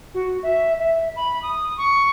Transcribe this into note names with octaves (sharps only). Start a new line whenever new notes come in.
F#4
E5
E5
B5
D#6
C#6